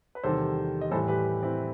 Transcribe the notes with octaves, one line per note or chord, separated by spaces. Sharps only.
B4
E2 C3 D#3 G3 A4 C5
D#5
A2 E3 G3 A4 C5
G4 B4
C4 E4